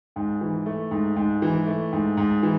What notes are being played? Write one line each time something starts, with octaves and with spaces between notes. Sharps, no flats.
G#2
E3
A3
G#2
G#2
E3
A3
G#2
G#2
E3